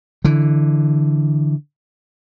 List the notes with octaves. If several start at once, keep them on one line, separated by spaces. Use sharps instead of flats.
D3 E3